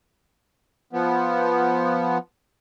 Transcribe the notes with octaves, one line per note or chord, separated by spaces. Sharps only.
F3 B3